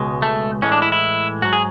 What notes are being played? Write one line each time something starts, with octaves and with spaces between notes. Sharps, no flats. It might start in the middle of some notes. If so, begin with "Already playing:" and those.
Already playing: C#2 B2 G#3
A3
A2 E3 G#3 C#4
D4
E4
E4
G#2 F#3 F#4
G#4